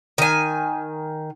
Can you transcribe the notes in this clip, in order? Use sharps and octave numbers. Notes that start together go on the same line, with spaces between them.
D#3 G#5